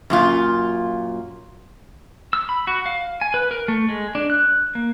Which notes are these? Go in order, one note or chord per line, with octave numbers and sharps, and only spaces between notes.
F#2 A#2 F4
E6
B5
F#4
F5
G#5
B4
A#4
A3
G#3
D4
F#6
A#3